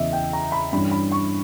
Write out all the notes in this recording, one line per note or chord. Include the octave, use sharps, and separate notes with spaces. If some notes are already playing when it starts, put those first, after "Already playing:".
Already playing: E2 C#3 E3 D#5 E5
G5
A#5
B5
G2 E3 G3 C#4 B5
B5
C#6